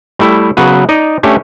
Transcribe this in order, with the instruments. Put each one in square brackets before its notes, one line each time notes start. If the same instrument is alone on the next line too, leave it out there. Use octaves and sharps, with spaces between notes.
[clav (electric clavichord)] G3 A3 E4
C#3 F#3 B3 B4
D#4 D5 D#5
A3 C#4 D4 G4